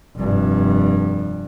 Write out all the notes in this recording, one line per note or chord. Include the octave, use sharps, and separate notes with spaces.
F1 G2